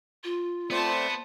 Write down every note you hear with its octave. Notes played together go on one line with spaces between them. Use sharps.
F4
A3 B3 C4 C5 D5 A5